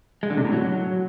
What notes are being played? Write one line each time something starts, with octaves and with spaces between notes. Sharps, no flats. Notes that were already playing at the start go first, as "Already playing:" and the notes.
G#3
D3
C3
A2
F#3